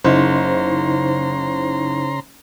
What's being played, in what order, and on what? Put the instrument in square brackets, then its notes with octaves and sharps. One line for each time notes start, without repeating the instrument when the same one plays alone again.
[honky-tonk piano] F#1 [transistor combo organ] C#3 A#5 C6 [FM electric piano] D#4 E4 C5